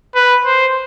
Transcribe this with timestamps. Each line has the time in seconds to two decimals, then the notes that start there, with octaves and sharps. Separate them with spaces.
0.15 B4
0.45 C5